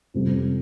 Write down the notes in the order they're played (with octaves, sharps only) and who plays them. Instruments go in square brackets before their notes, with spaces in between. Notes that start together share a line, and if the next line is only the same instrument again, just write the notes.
[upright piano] F2 C3 G3